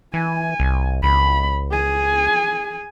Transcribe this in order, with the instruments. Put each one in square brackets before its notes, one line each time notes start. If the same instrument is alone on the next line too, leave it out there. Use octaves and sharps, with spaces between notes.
[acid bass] E3 [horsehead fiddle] G#5
[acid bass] C2
[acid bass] C#2 [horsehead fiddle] B5
[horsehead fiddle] G#4 G#5